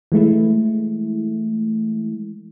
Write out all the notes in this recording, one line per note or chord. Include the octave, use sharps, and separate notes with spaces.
E3 G#3 A3 E4